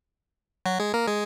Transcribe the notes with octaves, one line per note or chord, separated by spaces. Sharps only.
F#3 F#4
G#3 G#4
A#3 A#4
G#3 G#4